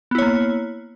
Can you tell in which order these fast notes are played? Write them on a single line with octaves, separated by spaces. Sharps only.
B3 E4 C#5 A#3